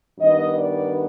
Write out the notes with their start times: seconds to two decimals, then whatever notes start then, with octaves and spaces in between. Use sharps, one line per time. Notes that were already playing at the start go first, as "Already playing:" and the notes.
0.19 G2 D#3 G3 B3 D#5
0.55 D5